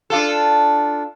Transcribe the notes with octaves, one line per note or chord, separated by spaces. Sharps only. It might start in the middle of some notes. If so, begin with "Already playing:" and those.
D4 F4 A4